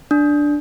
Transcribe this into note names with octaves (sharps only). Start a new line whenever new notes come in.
D4